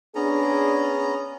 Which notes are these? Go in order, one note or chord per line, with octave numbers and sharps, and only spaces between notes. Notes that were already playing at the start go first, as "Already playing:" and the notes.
B3 C#4 D4 G#4 A#5